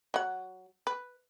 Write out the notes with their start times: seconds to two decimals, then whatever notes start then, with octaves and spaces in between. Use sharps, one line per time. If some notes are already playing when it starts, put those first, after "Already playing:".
0.14 F#3 F#5
0.87 B4